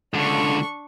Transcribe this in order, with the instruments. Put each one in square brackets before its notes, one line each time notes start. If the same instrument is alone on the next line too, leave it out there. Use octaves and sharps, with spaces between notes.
[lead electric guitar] C#2 D3 [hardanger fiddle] D4 C#6